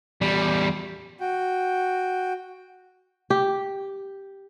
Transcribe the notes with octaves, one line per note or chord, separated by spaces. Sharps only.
E2 G3
F#4 G5
G4